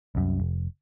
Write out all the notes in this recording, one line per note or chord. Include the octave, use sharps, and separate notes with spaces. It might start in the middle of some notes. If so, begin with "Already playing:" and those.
C2 F#2
F1